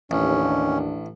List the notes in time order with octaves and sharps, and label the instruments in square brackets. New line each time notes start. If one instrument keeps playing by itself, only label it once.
[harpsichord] A1 [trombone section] D#2 [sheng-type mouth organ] C#4 [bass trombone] D4